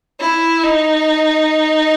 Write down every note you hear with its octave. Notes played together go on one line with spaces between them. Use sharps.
E4
D#4